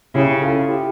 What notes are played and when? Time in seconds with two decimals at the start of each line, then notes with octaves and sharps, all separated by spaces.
0.15 C#3 E4 G4
0.41 F4 A4
0.68 E4 G4